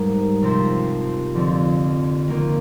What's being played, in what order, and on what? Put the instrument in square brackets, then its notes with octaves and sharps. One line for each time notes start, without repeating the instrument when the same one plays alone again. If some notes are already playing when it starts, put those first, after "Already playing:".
Already playing: [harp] G#2 G3 A#3 D#4
C3 F3 C4 G4 C5
F2 D3 F3 C4
D#3 A#3 F4